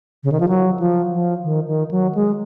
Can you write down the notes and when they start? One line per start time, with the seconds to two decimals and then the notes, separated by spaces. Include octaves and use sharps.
0.24 C#3
0.32 D#3
0.40 F3
0.48 F#3
0.80 F3
1.12 F3
1.44 D#3
1.67 D#3
1.91 F#3
2.15 G#3